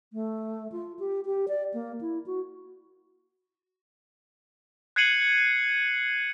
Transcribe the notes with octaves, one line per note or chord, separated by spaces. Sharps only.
A3
F4
G4
G4
D5
A#3
E4
F#4
F#6 G#6 C7 C#7 D#7 F#7